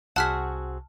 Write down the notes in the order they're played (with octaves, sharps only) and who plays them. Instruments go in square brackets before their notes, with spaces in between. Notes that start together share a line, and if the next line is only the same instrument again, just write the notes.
[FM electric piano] C2 [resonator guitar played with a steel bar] C4 F#4 G#4 [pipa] F#5 [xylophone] A5 F6 B6